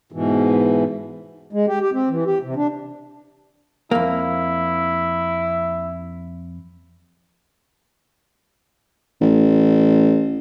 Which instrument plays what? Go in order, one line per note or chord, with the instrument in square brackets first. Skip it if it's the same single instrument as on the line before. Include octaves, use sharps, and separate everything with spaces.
[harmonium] G#2 B2 E3
G#3
G4
G4
C4
E3
G4
C3
D4
[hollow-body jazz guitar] F2 A#3 [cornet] E4
[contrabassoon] A1